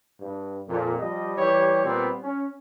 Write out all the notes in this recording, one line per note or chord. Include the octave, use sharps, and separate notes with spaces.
G2
F2 A#2
F3 G3 D#5
E3 G4 C#5
A#2 B3 C4
C#4